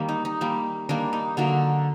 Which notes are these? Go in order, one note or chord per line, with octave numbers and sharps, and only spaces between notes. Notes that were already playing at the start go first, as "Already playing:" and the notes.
Already playing: D#3 G3 A#3
D#4
D#4
D#3 G3 A#3
D#3 G3 A#3 D4
D#4
D3 F#3 A#3 D#4